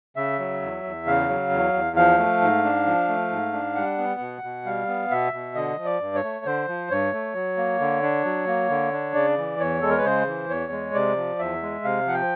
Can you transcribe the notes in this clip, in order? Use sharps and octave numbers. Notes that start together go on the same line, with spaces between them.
C#3 E5
F#3
E2
E2
C#3 F5
F#3
E2
E2
F3 F5
A3
G#2
D4
F3
A3
G#2
D4
G3 F#5
B3
B2
B2
G3 F5
B3
B2 E5
B2
D3 D#5
F3
D5
G2
C#5
A3
D3 C5
F3
G2 C#5
A3
F#3
A#3
D3
D4
F#3
A#3
D3
D4
C#3 D5
E3
E2 C#5
G#3 A4
A#4
B4
C#3 C5
E3
E2 C#5
G#3
C3 D5
F3
E2 E5
G#3
C3 F5
F3 F#5
G5